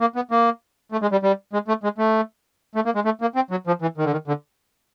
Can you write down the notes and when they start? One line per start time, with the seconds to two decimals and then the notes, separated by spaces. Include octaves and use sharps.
0.01 A#3
0.16 B3
0.31 A#3
0.92 A3
1.02 G#3
1.12 G3
1.23 G3
1.53 G#3
1.68 A3
1.83 G#3
1.98 A3
2.75 A3
2.85 A#3
2.95 G#3
3.05 A3
3.21 A#3
3.35 C4
3.51 F#3
3.67 F3
3.82 E3
3.98 D#3
4.05 D3
4.12 D#3
4.28 D3